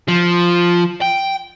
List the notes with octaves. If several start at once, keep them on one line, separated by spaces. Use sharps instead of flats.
F3
G5